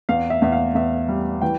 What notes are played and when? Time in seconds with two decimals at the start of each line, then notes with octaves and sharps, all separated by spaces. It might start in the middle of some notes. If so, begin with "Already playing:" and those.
0.09 E2 F5
0.30 E5
0.42 E2 E5
0.52 F5
0.75 E2 E5
1.09 G3
1.42 E3 G5